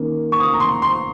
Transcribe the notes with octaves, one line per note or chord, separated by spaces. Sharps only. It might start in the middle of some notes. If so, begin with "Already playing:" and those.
Already playing: D#3 A#3 C#4
C#6
D#6
A#5
C6
C6